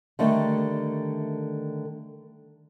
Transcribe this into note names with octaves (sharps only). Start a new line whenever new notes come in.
D3 D#3 G3 A3